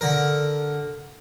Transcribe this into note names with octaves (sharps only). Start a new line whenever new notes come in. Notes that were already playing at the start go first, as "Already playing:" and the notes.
D3 A#4